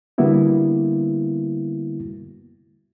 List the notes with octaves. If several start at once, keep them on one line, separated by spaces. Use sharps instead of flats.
D3 G3 A#3 B3 E4 F#4